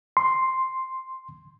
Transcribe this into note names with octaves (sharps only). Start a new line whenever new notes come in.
C6